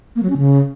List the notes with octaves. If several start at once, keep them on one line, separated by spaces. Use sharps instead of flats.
A#3
F#3
C#4
C#3